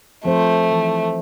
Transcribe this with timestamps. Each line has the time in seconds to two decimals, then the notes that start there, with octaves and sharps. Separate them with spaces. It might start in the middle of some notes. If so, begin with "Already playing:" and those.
0.25 F3 A3 C4 C5
0.71 E3